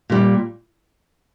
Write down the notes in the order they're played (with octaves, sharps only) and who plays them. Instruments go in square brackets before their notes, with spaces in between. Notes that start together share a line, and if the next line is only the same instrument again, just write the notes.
[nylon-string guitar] A#2 G3